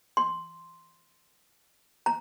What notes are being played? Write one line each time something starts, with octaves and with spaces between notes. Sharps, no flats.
C6
A#5